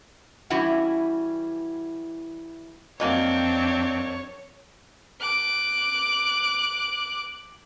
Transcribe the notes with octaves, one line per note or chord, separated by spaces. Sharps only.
E3 G3 C#4 E4 F#4
F2 D#3 F#3 A#3 C4 D4 C#5
D6 F#6